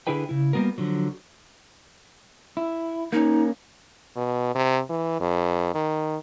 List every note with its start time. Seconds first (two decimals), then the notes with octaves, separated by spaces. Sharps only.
0.07 D3 E4 G#4 B4 G5
0.29 C#3 E4
0.53 G3 A#3 B3 F#4 A#4
0.78 D3 F3 F#3
2.57 E4
3.13 A#3 C#4 D#4
4.16 B2
4.55 C3
4.89 E3
5.20 F2
5.75 D#3